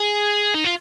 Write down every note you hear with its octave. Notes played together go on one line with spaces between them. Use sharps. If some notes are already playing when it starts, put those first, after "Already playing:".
Already playing: G#4
D#4
F4